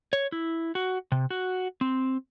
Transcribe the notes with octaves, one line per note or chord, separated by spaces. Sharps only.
C#5
E4
F#4
C3
F#4
C4